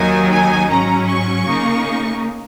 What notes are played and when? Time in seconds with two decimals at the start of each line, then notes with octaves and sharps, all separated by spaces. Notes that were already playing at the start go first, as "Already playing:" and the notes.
Already playing: D#2 D#3 F#3 D#4 G#5
0.30 G#5
0.68 G#2 F#3 C#4 A#5
1.07 C#6
1.45 C#3 A#3 D#4